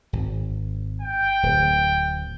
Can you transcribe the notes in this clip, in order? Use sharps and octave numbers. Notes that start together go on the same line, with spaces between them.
G#1
G5
D1